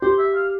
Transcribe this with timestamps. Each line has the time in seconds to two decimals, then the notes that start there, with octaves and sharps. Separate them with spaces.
0.02 G4 C5
0.19 E5
0.35 F5